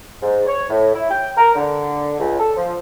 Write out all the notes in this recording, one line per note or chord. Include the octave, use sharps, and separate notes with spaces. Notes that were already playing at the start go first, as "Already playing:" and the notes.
G#2
C#5
A2
E4
G5
A#4
D3
C#2
A4
F3